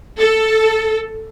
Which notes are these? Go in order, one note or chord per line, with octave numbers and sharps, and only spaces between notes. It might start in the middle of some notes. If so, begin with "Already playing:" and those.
A4